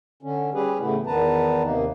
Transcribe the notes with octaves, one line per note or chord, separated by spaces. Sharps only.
D3 C#4
G3 C#4 G4 G#4 B4
A2 C#3 E3 A3 B3 E4
E2 D#3 B3 B4 A5 A#5
D#2 C3 A#3 D#4